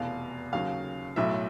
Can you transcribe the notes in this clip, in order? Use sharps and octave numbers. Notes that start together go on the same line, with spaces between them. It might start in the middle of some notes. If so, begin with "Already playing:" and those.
Already playing: F1 E2 B2 F5
D#2 C#3 F#3 F5
B1 A2 F#3 E5